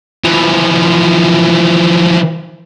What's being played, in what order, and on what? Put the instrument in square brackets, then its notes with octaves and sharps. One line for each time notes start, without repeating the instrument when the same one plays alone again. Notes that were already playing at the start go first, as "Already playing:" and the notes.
[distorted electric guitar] E3 F3